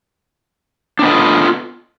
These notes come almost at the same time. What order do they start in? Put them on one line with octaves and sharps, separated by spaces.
D4 B3 D#5 A4 F4